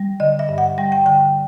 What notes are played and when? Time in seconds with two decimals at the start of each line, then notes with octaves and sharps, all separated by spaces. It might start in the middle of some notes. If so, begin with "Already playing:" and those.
Already playing: G3
0.20 D3 D#5
0.39 E5
0.49 G2
0.58 F#5
0.78 G3 G5
0.92 G5
1.06 D3 G5